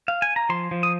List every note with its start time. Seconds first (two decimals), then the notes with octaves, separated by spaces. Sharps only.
0.08 F5
0.22 G#5
0.36 A#5
0.49 F3 C6
0.71 F3
0.83 D#6